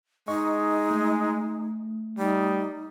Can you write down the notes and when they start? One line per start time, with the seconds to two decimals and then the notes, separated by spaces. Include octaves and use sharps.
0.28 G#3 D#4 D#5 C#6
0.91 A3
2.19 G3 D#4